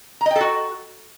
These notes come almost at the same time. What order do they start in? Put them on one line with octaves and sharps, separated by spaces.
A#5 D#5 G5 A4 F#4